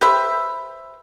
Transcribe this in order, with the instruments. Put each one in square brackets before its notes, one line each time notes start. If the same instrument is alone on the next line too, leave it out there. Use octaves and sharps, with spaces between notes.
[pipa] G4 B4 C5 E5